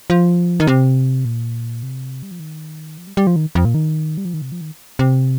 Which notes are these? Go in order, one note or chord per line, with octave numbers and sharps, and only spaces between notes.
F3
D#3
C3
A#2
C3
G3
F3
D#3
F3
G3
G3
F3
D#3
F2
A#2
D#3
G3
F3
D#3
C3
F3
D#3
C3